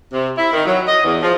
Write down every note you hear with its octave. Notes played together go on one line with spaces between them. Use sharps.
C3
E4
D#3
F#3
D#5
E2
F3